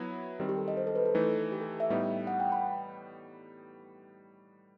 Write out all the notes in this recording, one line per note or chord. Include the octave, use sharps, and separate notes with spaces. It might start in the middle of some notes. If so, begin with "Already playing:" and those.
Already playing: F#3 B3 E4
D#3 G3 C4
G4
A4
D#5
C5
A4
B4
A4
E3 A3 D#4
G4
A4
E5
A2 G3 B3 D#4
F#5
G5
B5